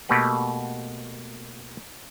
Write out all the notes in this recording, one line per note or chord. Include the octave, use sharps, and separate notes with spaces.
B2 A3 A#3 G4 B4 F#5